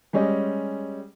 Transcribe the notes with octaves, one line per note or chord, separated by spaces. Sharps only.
G3 G#3 C#4 G4 D#5